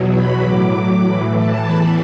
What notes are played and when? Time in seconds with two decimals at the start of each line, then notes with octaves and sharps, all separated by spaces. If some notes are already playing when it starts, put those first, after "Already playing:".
Already playing: E2 B2 F#3
0.12 B5
0.42 A2 F#3 D6
1.05 A2 E3 B5
1.35 A5
1.65 E2 E3 B5